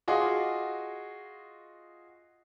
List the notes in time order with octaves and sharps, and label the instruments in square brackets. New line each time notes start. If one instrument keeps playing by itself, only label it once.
[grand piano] F4 F#4 G#4 D#5 C6 D6